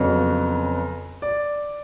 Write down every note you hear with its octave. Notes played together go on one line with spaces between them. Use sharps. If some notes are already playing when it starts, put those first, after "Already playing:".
Already playing: F2 C#3 F#3 B3
D5